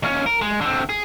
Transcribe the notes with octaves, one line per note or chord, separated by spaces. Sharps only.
D#2 C#4
A#4
G#3
D3 C4
G#4